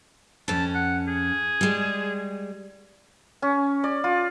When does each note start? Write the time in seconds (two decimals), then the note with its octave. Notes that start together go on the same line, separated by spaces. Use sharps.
0.48 F2 C#4 A5
0.74 F#5
1.07 G#4
1.61 G3 G#3
3.42 C#4
3.84 D5
4.04 F4